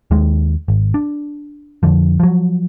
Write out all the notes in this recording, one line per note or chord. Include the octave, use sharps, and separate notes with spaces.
D#2 D#3 G#3
G#1
D4
F2 D3 F3
F3 F#3